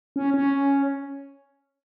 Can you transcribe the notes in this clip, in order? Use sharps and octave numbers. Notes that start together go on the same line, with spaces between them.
C#4
C#4